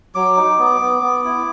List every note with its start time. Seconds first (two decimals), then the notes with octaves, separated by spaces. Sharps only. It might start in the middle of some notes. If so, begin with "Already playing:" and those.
0.15 F#3 D6
0.37 D#4
0.59 B3
0.80 B3
1.02 B3
1.25 E4